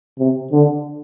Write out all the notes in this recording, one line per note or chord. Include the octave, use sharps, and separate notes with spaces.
C3
D3